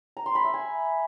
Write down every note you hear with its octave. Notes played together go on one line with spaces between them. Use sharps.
A#5
C6
B5
E5
G#5